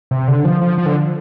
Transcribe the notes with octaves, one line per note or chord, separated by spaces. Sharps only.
C3
D3
F3
F3
F3
D3